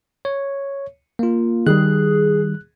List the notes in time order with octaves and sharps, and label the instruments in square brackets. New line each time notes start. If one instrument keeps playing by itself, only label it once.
[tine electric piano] C#5
A#3 F4
[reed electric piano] D#3 G3 [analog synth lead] G#4 [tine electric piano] F#6